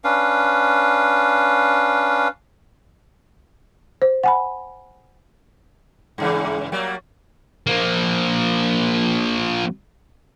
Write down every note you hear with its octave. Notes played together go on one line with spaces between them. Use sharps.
C#4 D4 B4 F5
C5
F#5 G#5 B5
G2 C#3 E3
F#3 G3 A#3
F3 A#3